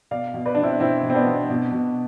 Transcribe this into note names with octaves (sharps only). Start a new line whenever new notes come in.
B2 D5 F5
B2
B4 D5
B2 D4
C4 E4
B2 C4 E4
B2
C4
B3 D4
B2
B2
B2